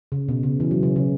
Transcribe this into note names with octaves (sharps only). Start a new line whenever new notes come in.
C#3
B2
C#3
E3
F#3
C#3
C#3